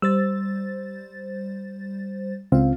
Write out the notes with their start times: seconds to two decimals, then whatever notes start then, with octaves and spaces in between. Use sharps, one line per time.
0.02 G3 C5 E6 A6
2.52 C#2 C4 F4 F5